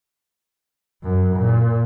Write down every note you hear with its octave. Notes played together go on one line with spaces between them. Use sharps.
F#2
A#2